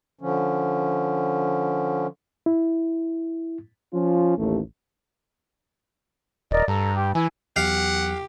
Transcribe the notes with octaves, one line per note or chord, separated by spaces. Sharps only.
D3 F3 C#4
E4
F3 C#4 F4
A1 D#2 A3
D#1 A#4 D5 D#5
G2 A4 A#5
G4
E3 E4 G#5
E2 F#3 G4 F5 F#5